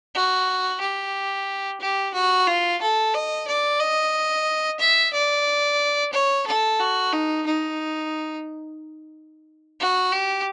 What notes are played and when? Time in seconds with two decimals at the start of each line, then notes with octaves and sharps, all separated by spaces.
0.15 F#4
0.80 G4
1.80 G4
2.14 F#4
2.47 F4
2.81 A4
3.14 D#5
3.47 D5
3.80 D#5
4.80 E5
5.13 D5
6.13 C#5
6.47 A4
6.80 F#4
7.13 D#4
7.46 D#4
9.80 F#4
10.12 G4